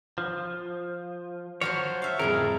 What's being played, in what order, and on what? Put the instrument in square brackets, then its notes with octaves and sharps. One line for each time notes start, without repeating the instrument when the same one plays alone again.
[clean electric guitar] F3
[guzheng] F3 F#3 C5 [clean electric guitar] F#4 C#5
[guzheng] E5 F5
[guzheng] F2 A2 G3 [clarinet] G#4 [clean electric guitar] A#4